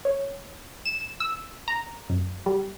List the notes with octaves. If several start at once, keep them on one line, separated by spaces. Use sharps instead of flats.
C#5
E7
E6
A#5
F#2
G3